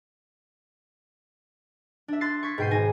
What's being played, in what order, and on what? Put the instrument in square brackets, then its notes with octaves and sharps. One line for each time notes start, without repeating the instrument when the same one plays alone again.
[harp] D4 E5
C6 F#6 A6 C7
C#6 G#6 B6
G#2 B2 G5 G6 C7 D#7
G#1 G#5 A#6